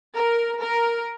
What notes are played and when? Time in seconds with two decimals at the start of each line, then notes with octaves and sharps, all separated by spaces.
0.15 A#4
0.61 A#4